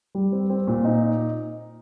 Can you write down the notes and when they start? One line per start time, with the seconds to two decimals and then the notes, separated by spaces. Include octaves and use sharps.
0.15 G3
0.32 C4
0.50 C4
0.67 A#2
0.85 D#4